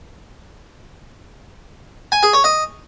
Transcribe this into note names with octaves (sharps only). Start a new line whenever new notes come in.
G#5
G#4
C#5
D#5